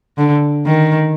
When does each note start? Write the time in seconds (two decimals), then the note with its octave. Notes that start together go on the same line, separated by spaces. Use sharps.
0.18 D3
0.66 D#3